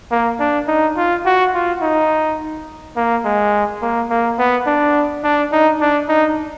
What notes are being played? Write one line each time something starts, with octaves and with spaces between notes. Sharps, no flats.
A#3
D4
D#4
F4
F#4
F4
D#4
A#3
G#3
A#3
A#3
B3
D4
D4
D#4
D4
D#4